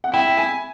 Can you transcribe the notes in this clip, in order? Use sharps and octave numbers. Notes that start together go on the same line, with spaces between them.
F#5
E4 G5
G#5